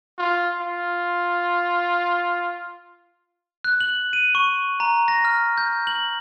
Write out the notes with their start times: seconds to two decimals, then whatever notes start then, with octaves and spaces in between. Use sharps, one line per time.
0.18 F4
0.60 F4
3.64 F#6
3.80 F#7
4.13 D#7
4.35 C#6
4.80 A#5
5.08 A#6
5.25 F6
5.58 G6
5.87 F#7